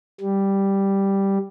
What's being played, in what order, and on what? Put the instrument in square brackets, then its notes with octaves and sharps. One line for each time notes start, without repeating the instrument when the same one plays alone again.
[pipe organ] G3